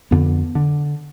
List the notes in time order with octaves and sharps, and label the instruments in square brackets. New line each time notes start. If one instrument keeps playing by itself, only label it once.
[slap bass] F2 D3 B3
D3